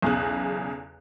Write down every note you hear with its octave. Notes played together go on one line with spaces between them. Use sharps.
B1 E2 C#3 F#6